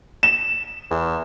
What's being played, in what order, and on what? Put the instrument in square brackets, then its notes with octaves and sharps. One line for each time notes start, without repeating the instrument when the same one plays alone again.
[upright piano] E7
[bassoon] E2